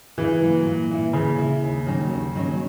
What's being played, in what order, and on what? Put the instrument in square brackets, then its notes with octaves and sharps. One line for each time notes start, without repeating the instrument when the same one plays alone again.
[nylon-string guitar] C#3 [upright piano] E3
[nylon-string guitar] F#3 A#3
A#2
A#3 E4
[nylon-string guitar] A#2 [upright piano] C#3
[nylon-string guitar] A#3 E4
D#2
D#3 F#3 A#3 C#4
D#2
D#3 F#3 A#3 C#4